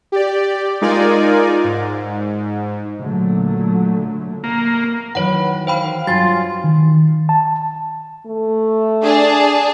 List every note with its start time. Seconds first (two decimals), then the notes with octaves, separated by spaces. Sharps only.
0.12 G4 D5
0.81 G#3 D#4 F4 A#4 D5 G#5
1.64 G#2
2.99 A#2 D3 F#3 A3
4.44 A#3
5.15 D#3 E3 F#3 B4 C#5 F#5
5.67 C5 F5 G5 B5
6.07 G2 F#3 F4 G#5 C6 A6
6.64 D#3
7.29 A5
8.27 A3
9.03 D4 G#4 A5